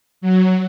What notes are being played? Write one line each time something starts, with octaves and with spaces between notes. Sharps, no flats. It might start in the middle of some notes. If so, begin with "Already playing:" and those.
F#3